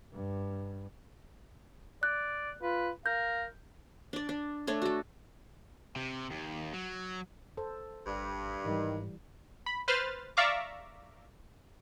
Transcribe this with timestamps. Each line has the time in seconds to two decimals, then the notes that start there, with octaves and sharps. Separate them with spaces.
0.13 G2
2.03 D5 F#6
2.62 F4 B4
3.06 A#4 F5 G6
4.13 D4 D5
4.29 D4
4.67 A3 D4 C#5
4.82 F#4 A4
5.96 C3
6.31 D#2
6.74 F#3
7.57 A4 C5
8.06 G#1 G2
8.65 G#2 D#3 E3 G3
9.66 B5
9.88 B4 C5 F6 A6
10.37 D5 E5 F5 A#5 C#6 D6